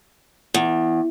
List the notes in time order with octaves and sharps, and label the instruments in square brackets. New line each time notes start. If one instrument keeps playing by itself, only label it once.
[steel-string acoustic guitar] E2